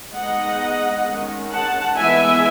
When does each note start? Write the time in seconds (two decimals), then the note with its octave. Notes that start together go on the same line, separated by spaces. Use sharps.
0.13 G#3 B3 D#4 D#5 F#5
1.06 D#3 G#3 C#4
1.52 F#5 A5
1.98 E3 G#3 B3 E4 E5 G#5